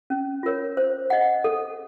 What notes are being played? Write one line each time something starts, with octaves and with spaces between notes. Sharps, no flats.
C#4
F4 A#4 C#5
C5
D#5 F#5
A4